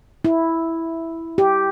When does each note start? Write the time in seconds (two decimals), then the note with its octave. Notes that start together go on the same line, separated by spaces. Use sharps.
0.25 E4
1.38 G4